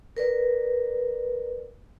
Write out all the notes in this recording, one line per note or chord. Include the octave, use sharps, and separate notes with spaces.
A#4 B4 D5